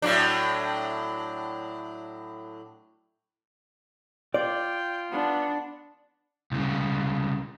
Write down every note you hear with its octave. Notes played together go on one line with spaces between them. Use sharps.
A2 F#3 D4
F4 D5 G5
B3 D4 F#5
C2 C#3